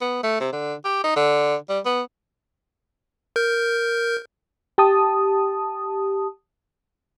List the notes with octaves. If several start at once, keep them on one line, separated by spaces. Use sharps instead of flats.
B3
A3
C3
D3
G4
D#4
D3
G3
B3
A#4 G6
G4 A5 D#6